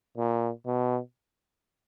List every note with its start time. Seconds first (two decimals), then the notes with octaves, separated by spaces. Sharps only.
0.18 A#2
0.66 B2